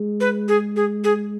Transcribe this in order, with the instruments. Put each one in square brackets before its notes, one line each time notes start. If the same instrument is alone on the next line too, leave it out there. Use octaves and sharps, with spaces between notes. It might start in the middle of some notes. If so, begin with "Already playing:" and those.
Already playing: [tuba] G#3
[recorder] B4
G#4
G#4
G#4